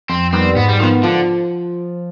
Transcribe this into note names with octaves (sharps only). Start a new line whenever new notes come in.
F2 C4
D#3 G3 B3 C4
G#2 B3
G3
D#3 F3 B3
D3 F3